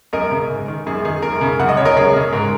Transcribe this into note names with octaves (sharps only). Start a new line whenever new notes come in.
F#2 A#4 D#5
C#3
G#2
D#3
F#2 G#4
D#3 G#4
F#2 A#4
C#3
F#2 F#5
D#5
C#3 C#5
A#4 D#5
F#2 G#4 C#5
C#3
G#2 A#4